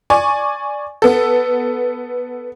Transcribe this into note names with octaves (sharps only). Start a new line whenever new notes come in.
D5 G#5 C#6
B3 A4